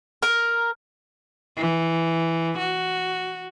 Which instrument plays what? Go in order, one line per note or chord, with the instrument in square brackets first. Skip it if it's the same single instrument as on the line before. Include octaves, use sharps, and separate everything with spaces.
[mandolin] A#4
[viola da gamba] E3
F#4